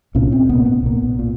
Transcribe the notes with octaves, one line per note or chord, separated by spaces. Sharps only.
C2 A#2 C#4
C4
C2 A#2 B3
B3
B1 A#2
A#2